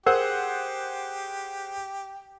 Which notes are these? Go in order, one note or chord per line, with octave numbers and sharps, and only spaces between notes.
G4 G#4 A#4 C5 F#5